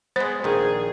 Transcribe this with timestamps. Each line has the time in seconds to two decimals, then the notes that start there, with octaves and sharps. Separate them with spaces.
0.16 G#3 B3 C5
0.44 A#1 D#3 G#4